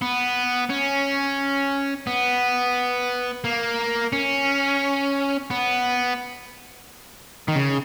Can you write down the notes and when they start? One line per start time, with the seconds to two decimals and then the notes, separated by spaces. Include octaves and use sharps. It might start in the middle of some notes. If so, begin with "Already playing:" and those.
0.02 B3
0.70 C#4
2.07 B3
3.44 A#3
4.13 C#4
5.50 B3
7.48 D#3
7.56 C#3